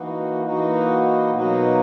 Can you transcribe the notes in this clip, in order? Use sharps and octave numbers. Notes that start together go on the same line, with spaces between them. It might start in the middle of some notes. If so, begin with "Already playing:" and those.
Already playing: E3 A#3 D#4 F#4
E3 A#3 D#4 F#4
B2 F#3 A#3 D#4 F#4